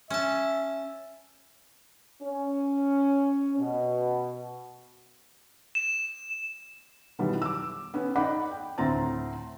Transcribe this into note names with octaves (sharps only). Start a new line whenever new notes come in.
C#4 E5 A5
C#4
B2
E7
B2 D#3 E3 F#3 G3 B3
D6 E6
B3 C#4
D#4 D5 F#5 B5 D6
G5
D2 A2 C4 A#5 A6